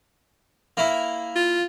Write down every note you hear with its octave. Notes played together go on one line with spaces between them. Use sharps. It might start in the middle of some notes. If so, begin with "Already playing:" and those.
A#3 E4
F4